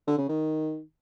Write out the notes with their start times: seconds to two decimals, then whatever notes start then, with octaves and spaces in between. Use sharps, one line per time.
0.07 D3
0.18 C#3
0.29 D#3